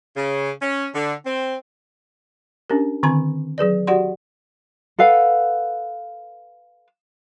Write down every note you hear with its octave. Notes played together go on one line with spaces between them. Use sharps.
C#3
C#4
D3
C4
C#4 D4 G4 A#4
D3 D#3 C4 G#5 A#5 C6
F#3 G#4 B4 D5
F#4 G4 D5 F#5 C6
A4 B4 F5 F#5